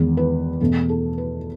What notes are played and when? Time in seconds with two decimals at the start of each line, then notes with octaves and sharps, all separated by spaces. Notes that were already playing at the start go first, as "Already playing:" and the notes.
Already playing: E2 D#3 G#3 B3
0.17 B4
0.61 E2 B2 A3
0.89 A4
1.18 B4